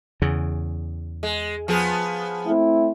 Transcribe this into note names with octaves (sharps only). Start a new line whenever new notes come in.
E2 C#3
G#3
F3 B3 G#4
A3 C4 E4